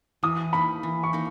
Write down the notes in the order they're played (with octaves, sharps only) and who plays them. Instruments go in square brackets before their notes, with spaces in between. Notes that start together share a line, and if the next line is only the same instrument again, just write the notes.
[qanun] E3 [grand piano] D#6
[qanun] A#3 D#4 [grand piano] B5
[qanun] E3
[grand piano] C#6
[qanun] A#3 D#4